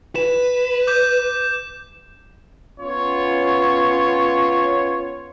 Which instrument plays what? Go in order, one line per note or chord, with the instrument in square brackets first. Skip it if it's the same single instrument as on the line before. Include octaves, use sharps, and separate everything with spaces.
[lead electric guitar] B4 [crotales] E7
[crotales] D6 G6 E7
[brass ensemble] B3 C#4 F4 C#5